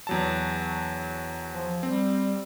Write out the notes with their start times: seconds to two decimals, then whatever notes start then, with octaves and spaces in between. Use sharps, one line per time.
0.07 E2 F#3 A5
1.49 F3
1.83 G3 C4